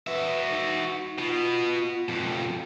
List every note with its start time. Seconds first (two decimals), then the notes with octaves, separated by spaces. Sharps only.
0.07 F#4 B4 E5
0.51 D#4
1.18 B2 B3 F4
2.09 F2 B2